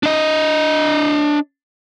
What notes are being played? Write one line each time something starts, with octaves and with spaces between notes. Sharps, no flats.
D4 D#5